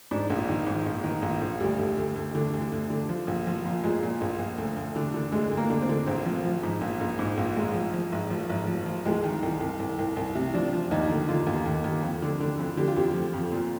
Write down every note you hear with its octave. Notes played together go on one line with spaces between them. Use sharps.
G#2 D4
A#1
D#3
G#2
A#1
D#3
A#1
A#1
D2 G3
D2
D2
D2
D3
D2
D2
D3
F3
A#1
F3
A#2
A#2 G#3
A#2
A#1
A#1
D2
D2
D3
D3
D2 G#3
D2
A#3
D3
C4
D3
A#1 C4
F3
F3
G#2
A#1
A#1
G#2
A#1
G#1 G#3
F3
F3
G#1
F3
G#1
F3
F3
C2 G#3
D#3
C2
C2
C2
C2
C2
C3
F3 D4
F3
D#2 D#4
D3
D3 F4
D#2
D#2
D#2
F2
D3
D3
F2
D3 G4
F4
F2 G4
F3
F2
A#2